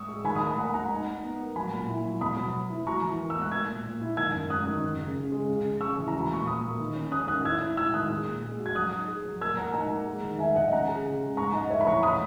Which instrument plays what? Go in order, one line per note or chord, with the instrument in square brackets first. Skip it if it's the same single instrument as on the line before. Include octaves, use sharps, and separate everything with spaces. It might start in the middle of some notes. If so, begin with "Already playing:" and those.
Already playing: [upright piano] C#6 D#6 E6
[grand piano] G#3
[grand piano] D#3 [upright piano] G#5 B5
[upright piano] B5 D#6
[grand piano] A#3
[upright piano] G#5 B5
[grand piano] A#3 [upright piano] F#5 A#5
[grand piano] A#3 [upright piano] F#5 A#5
[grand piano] D#4
D#4
B3
A#4
[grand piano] F#3 [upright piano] G#5 B5
[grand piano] A#2
E4
F#3
[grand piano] B2 [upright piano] B5 D#6
[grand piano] F#3
B3
E4
[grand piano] F#4 [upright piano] A#5 C#6
[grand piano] E3
A#4
[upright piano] E6
[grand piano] B3
[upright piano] F#6
[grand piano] A#3 [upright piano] E6 G#6
[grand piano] A#2
A#2
E4
[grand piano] D#3 [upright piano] E6 G#6
[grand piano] F#2
[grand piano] F#2 [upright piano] D#6 F#6
[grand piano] D#3
F#2
C#3
C#3
G#3
C#3
C#3
[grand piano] C#3 [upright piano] C#6 E6
[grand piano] E3
[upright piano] A#5
[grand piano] F#4
[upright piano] B5
[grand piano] A#2 [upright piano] C#6
[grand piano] A#2 [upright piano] B5 D#6
[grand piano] A#3
D#3
C#4
[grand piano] C#4 [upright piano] D#6 F#6
[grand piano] D#3 [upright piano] D#6 F#6
[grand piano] E4 [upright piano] E6 G#6
[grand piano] E4
[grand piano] E4 [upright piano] E6 G#6
[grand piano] D#3 [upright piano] D#6 F#6
[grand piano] G#3
A#2
G#3
F#4
[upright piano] G#6
[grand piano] F#3 [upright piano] D#6 F#6
[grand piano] D#4
G#4
F#3
[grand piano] A#3 [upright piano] E6 G#6
[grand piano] A#4 [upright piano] F#5 A#5
[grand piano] D#4 [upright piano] F#5 A#5
[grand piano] A#3
G#3
D#3
[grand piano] D#3 [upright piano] E5 G#5
[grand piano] D#3 [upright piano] D#5 F#5
[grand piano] C#4 [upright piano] F#5 A#5
[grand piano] G#4
C#3
G#3
[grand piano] G#2 [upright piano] A#5 C#6
[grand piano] G#2 [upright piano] D#5 F#5
[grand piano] A#3 [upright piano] C#5 E5
[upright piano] B5
[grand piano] E3 [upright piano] A#5 C#6
[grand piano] E3 [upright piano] B5 D#6